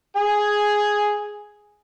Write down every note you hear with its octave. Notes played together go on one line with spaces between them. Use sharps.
G#4 G#5